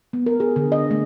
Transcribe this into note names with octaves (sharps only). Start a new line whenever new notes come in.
B3
A#4
G#4
D3
D#5
A3